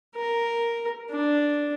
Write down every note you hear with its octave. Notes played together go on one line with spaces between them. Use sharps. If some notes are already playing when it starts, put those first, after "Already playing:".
A#4
D4